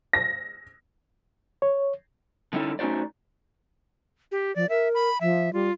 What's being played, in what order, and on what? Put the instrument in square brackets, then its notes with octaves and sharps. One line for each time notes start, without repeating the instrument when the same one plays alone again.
[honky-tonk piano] A#6
[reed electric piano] C#5
[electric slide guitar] D3 G3 C#4 D#4 E4 A4
A3 C#4 D#4 F#4 C5 D5
[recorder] G4
[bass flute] F3 [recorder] D5
[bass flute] A#4 [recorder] E5
[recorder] B5
[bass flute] F3 [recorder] E5
[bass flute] G3 [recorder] F4